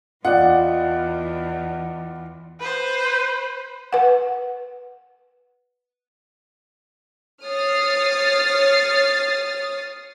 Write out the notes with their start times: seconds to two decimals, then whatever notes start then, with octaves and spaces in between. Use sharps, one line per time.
0.25 E2 E3 F4 D5 D#5 F#5 G5
2.59 B4 C5
3.93 B4 F#5
7.45 C#5 D#6 F6 A6 C7